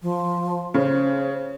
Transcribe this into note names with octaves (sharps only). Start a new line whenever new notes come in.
F3
C#3 C5